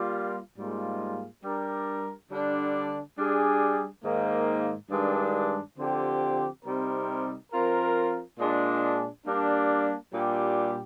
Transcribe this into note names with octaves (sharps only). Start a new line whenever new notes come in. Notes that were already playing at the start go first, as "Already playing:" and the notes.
Already playing: G3 A#3 F4
G#2 G3 A#3 F4 G#4
G3 D4 G4 A#4
D3 G3 D4
G3 D4 G#4
G#2 D#3 A#3
G2 D#3 G#3 D4
D3 F3 C4 G4
C3 G3 C4 D#4 A#4
F3 C4 F4 A#4
A#2 G#3 D4 G#4
G3 A#3 D4
A#2 G3 D4 G4